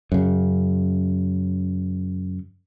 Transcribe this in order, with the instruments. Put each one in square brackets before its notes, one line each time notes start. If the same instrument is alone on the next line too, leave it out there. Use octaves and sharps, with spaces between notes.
[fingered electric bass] F#2 C#3